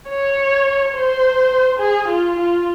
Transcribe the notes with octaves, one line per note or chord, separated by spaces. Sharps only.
C#5
C5
G#4
F4
F4